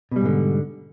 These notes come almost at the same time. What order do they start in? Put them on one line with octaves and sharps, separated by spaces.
B2 G3 G#2 D3